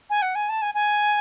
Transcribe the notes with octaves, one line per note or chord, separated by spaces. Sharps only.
G#5
F#5
G#5
A5
G#5
G#5